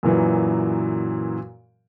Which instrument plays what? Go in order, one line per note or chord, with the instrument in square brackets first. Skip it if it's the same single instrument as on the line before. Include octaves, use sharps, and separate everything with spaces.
[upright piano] F#2 A#2 E3 F#3